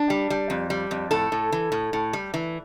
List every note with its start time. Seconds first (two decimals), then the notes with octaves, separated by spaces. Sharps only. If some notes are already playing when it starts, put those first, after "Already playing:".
Already playing: D4
0.10 G3
0.30 G3
0.50 F2
0.70 G3
0.91 F2
1.11 A2 A4
1.32 A2
1.52 E3
1.72 A2
1.93 A2
2.13 G3
2.34 E3